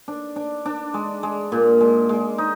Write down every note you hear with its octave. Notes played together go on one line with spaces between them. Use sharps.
D4
D4
D4
G#3
G#3
A#2
G#3
G#3
D#4